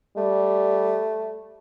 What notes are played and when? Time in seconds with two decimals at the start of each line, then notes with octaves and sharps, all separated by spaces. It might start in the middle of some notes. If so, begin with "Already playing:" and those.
0.17 G3 A3